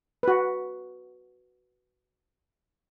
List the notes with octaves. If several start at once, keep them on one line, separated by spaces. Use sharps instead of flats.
F#4 B4